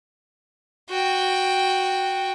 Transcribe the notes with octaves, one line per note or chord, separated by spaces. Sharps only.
F#4 G5